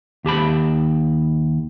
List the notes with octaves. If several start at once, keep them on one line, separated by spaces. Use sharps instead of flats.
D#2 G4 A5 B5